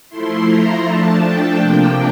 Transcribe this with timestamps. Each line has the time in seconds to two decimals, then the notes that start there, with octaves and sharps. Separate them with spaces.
0.08 F3 A3 E4 C6
0.47 A#5
0.83 F3 A3 D4 A5
1.22 G5
1.59 C3 F3 A#3 D4